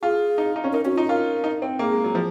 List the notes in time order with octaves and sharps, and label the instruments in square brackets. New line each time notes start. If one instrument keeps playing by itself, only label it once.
[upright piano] F4 [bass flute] G#4
[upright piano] D#4
D#4
C#4
[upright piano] D#4 [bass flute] A#4
[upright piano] C#4 [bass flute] F#4
[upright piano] D#4 [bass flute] F4
[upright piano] F4 [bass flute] A#4
[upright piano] D#4
C4
[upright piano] A#3 [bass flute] G#4
[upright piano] G#3
F#3
F3